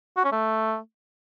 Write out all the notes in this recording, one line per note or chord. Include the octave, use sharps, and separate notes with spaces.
F#4
C#4
A3